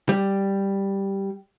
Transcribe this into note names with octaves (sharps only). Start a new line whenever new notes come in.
G3